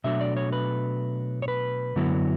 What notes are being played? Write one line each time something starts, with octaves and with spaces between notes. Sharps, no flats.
B2 F#3 A3 D4 E5
D5
C#5
B4
C#5
B4
F#2 D3 F#3 B3 E4